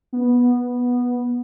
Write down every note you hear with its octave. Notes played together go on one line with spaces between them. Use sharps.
B3